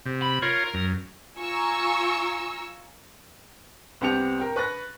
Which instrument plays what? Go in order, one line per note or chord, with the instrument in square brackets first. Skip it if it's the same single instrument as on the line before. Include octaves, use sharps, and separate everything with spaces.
[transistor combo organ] C3
[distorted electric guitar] B5
[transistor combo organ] F4 C#5 [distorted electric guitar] A#4
[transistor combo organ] F#2
[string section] F4 G#5 A#5 C#6 E6
[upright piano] C2 B3 C4 G4 C#7 F7
A#4 G5
B4 C#6 F#6 A6 A#6